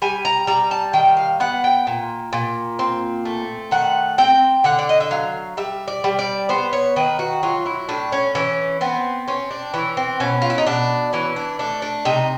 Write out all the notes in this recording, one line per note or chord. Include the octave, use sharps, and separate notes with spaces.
G3 G#5
A#5
G3 A#5
A5
D#3 G5
F5
B3 F#5
G5
A#2
A#2
C4
A3
D#3 F#5
C4 G5
D3 F#5
D5
D#5
E5
F#3 F5
G3 E5
D5
G3
D5
B3 C5
C#5
D#3 B4
F#4
F#3 F4
E4
A2 D4
C#4
E3 C#4
B3 C4
C4 C#4
D4
E3 C#4
C4
B2 C#4
F4
E4
D#4
B2 D4
E3 C#4
D4
A3 D4
D4
C3 D#4